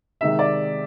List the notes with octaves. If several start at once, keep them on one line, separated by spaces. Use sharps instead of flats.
C3 D#3 G#3 E5
D5